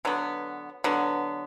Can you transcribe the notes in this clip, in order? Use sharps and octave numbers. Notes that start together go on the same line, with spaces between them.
D3 F#3 B3
D3 F#3 B3